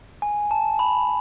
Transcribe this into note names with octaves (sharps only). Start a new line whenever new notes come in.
G#5
A5
B5